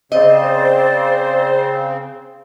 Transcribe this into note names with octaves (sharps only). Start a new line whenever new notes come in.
C#3 C4 C5 D5 D#5